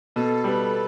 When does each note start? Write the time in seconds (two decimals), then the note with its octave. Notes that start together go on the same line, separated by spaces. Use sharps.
0.16 B2 A4
0.44 G3 B3